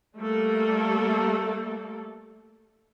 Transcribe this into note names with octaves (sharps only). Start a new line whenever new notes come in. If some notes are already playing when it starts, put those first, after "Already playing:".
G3 A3 A#3 A4